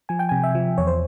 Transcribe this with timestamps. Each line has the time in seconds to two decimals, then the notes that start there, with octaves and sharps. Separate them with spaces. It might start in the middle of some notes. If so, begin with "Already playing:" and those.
0.09 F3 G#5
0.19 G5
0.29 C3 G#5
0.44 E5
0.55 F3
0.78 E2 C#5
0.87 C5